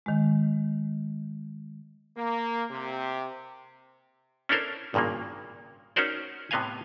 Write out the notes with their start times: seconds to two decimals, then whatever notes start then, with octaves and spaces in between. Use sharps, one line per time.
0.06 D#3 G#3
2.17 A#3
2.71 C3
4.49 C#4 D4 E4 A4 A#4 C5
4.94 G#1 G2 A#2 C#3 A#3
5.96 C#4 D#4 F#4 A#4 C5 D5
6.51 A2 C3 B3 D#5 F5 G#5